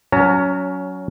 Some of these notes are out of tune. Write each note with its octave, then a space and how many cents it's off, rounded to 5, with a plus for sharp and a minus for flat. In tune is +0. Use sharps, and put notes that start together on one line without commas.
F#3 +0 C#4 +20 A#5 -35